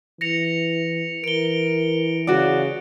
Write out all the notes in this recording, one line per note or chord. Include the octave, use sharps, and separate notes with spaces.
E3 A#6 C#7 F7
E3 A#4 D7 G7
C#3 F#4 D5